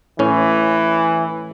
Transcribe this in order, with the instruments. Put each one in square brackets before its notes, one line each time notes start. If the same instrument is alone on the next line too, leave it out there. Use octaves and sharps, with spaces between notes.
[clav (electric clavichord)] A2 C#4 [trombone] E3